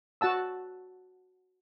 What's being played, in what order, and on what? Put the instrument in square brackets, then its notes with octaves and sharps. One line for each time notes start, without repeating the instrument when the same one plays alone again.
[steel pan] F#4 F#5 A5 E6